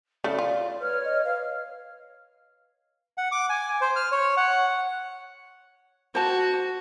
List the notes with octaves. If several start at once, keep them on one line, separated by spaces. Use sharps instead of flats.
C#3 A3 E4 D5
F4
B4 C#5 F6
D#5
B4 F5
F#5
D6
G#5
C5
F6
C#5
F#5
F#4 C5 A5